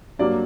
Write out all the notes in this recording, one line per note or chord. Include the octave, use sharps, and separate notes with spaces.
G2 F#3 A#3 D5